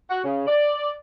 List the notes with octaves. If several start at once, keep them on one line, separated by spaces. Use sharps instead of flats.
F#4
C#3
D5